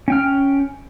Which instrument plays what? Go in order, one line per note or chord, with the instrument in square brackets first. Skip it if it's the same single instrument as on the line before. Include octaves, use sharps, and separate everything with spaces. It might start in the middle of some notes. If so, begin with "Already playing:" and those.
[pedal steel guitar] C#4 G5 F6